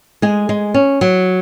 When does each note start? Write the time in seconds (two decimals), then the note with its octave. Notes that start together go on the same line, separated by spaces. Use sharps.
0.22 G#3 G#4
0.49 G#3
0.74 C#4
1.01 F#3